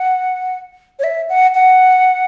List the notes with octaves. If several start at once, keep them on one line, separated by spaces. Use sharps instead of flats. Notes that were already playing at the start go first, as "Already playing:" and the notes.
Already playing: F#5
C#5
E5
F#5
F#5